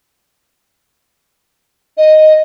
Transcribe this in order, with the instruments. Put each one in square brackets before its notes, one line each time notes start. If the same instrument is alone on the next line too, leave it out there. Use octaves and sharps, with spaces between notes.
[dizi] D#5